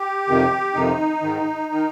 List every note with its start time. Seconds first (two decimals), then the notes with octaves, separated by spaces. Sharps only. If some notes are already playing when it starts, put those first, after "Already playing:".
Already playing: G4
0.28 F2 C3 D#3
0.74 F2 C3 D#3 D#4
1.22 G#2 D#3
1.72 D#3